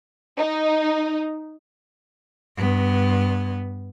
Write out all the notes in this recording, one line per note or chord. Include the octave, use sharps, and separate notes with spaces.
D#4
G2 B3